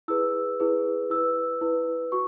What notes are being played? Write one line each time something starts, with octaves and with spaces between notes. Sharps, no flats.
E4 G#4 B4 E6
E4 G#4 B4
E4 B4 E6
E4 B4
F#4 C#6